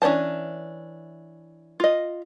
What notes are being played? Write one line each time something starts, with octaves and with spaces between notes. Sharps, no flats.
E3 C#4 D4 C5 A5
F4 D#5